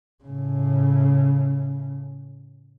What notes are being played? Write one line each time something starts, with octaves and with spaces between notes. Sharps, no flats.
A2 C#3